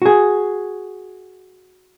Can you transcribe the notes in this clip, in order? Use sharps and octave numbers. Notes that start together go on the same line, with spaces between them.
F#4 G#4